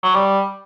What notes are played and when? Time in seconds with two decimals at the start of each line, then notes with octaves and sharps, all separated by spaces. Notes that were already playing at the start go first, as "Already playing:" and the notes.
0.03 F#3
0.15 G3